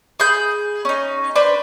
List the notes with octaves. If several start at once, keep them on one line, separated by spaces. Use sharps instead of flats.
G#4 B5 G6
C#4 D#4
D4 B4 C5